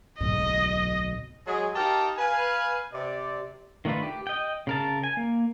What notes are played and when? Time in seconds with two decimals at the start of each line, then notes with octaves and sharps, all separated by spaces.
0.21 D1 B1 G#2 D#5
1.46 F#3 G#3 G#4
1.75 D#4 G4 A#4 F5 G5 A5
2.17 B4 F5 G#5
2.92 C3 D5
3.85 D#3 A3 D4 F4 B4
4.03 G4
4.27 D#5 G5
4.67 C#3 A#4 A5
5.04 G#5
5.17 A#3